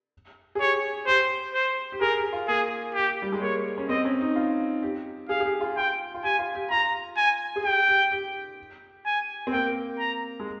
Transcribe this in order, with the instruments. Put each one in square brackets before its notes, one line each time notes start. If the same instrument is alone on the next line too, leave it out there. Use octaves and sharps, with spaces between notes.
[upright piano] G#4
[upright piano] G4 [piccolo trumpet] C#5
[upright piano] G4 [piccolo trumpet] C5
[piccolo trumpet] C5
[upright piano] G4
[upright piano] G#4 [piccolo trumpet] A#4
[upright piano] G4
F4
[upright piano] A#3 [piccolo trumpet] G#4
[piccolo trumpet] G4
[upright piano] G3
G#3
[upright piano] A#3 [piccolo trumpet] C#5
[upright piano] C#4
[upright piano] C4 [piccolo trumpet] D#5
[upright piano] C#4
D#4
F4
G4
[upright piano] G#4 [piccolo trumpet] F5
[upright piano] G#4
G4
F4
[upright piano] F4 [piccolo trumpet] G5
[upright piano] F4
[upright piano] G4 [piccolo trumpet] G#5
[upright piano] F4
G4
[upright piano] F4 [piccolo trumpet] A#5
[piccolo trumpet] G#5
[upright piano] G#4
[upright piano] G4 [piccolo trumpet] G5
[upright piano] G4
G4
[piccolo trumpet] G#5
[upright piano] C4
[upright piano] A#3 [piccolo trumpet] G5
[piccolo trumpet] A#5
[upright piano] G#3